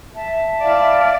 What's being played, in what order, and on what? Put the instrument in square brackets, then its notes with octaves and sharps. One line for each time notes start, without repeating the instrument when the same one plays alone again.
[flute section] E5 A5
[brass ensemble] E4 F5 [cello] D5